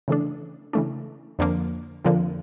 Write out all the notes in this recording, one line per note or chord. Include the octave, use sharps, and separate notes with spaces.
C#3 E3 A3 D4
C#3 E3 A3 D4
F2 D3 F3 A#3
F2 D3 F3 A#3